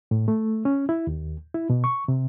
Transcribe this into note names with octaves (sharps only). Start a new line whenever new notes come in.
A2
A3
C#4
E4
D#2
E4
B2
C#6
C3